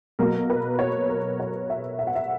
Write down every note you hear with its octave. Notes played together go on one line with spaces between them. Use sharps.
B2 F#3 A#3 A#4
B4
C#5
A#4
C#5
E5
E5
F#5
E5